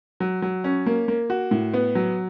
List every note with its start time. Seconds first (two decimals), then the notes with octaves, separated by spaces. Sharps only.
0.20 F#3
0.42 F#3
0.64 C#4
0.86 A#3
1.08 A#3
1.30 F#4
1.51 A2
1.74 B3
1.95 F#3